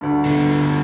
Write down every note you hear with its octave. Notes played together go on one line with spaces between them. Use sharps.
D2 G2
D3 B3